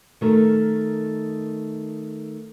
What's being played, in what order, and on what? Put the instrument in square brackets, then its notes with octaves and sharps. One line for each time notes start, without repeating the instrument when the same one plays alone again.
[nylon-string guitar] D#3 A3 A#4